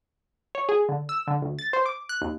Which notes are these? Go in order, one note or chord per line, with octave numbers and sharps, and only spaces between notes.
C#5
G#4
D3
E6
D3
D2
A6
C5
D6
F#6
D#2